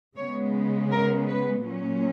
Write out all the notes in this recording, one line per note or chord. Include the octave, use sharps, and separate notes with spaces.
C#3 G#3 B3 C#5
A#4
B4
A#2 F#3 C#4